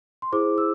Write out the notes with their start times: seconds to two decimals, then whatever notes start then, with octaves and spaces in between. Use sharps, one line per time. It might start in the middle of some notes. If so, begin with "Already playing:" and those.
0.22 C6
0.32 E4 G#4 C5 D6
0.58 E6